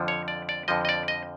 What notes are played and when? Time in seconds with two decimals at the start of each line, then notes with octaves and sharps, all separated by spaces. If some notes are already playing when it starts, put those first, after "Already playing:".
Already playing: F2 D3 F3
0.08 C#5
0.28 D5
0.49 D5
0.68 F2 D3 F3 D#5
0.85 D#5
0.89 D5
1.08 D#5